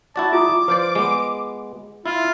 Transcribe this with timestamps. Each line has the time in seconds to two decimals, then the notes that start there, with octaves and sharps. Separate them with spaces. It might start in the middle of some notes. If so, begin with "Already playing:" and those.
0.16 E4 F#4 D5 A5
0.33 F4 A#5 D6 D#6
0.68 F3 B4 C5 D5
0.95 G#3 B3
2.06 E4 F4